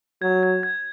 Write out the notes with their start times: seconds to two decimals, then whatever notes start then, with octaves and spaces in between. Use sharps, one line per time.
0.22 F#3 G#6
0.43 G#6
0.63 G#6